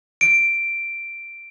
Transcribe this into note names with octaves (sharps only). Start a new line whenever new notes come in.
D7